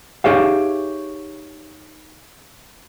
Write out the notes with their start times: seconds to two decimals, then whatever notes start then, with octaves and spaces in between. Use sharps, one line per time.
0.24 D#4 G4 G#4 C#5 E5 F5